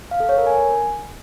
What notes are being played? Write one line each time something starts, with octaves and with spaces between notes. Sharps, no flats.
F5
A4
C#5
A#4
G#5